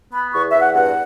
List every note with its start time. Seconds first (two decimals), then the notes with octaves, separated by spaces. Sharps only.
0.13 B3 B5
0.33 E2 C#6
0.51 E2 E5
0.61 F#5
0.74 G2 F#5